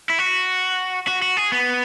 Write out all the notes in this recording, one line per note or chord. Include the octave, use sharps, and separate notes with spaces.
E4
F#4
F#4
F#4
G#4
B3